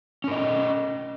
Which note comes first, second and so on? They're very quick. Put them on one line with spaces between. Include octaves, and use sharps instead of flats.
C#4 A#4 D#5